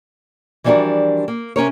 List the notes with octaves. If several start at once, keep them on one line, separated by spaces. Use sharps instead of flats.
E3 F3 G3 D4 F#4 A#4
A#3
C3 C#4 A#4 C#5